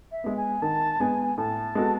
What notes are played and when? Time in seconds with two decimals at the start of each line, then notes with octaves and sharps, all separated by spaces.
0.11 E5
0.24 G#3 B3
0.36 G#5
0.62 D#3 A5
1.00 G#3 B3 G#5
1.37 A2 A5
1.75 G#3 B3 F#4 A4